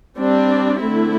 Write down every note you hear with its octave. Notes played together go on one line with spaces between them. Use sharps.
G3 C4 D4
D3 A3 C4 E4